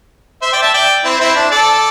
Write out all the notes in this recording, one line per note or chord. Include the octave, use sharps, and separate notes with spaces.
C5 E5
D5 G5
E5 A5
D5 G5
C4 E4
C4 E4
D4
A4 D5